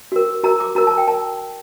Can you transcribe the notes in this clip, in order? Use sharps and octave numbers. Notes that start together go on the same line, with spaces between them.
F#4 A#4
F#4 A#4 A#5
D6
F#4 A#4 A#5
A5
G5
A#4 A5